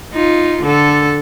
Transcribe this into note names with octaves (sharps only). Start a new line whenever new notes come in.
D#4 F4
D3 A4